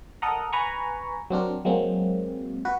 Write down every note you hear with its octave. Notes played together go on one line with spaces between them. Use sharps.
A4 A#4 D#5 F#5 A#5
B4 G#5 A#5 B5 C#6
F#3 C4 D4 A#4
F#3 G#3 A#3 C4
F#4 B4